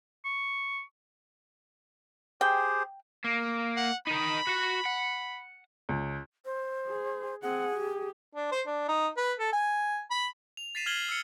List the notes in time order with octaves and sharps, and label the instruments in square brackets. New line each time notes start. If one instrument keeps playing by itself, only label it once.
[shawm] C#6
[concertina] G4 G#4 C5 [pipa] G5
[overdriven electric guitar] A#3
[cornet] F#5
[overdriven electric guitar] D#4 A#4 [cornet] B5
[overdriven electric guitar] F#4 F#5
F#5
[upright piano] C#2
[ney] C5
[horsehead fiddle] G#4
[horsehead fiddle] C4 F#5 [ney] G#4
[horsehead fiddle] G4
[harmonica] D4
C5
D4
D#4
B4
A4
G#5
B5
[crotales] F7
A6 B6 C7 D#7 E7
F6 G#6 C7 F#7 G7
E6 F6 C#7 G7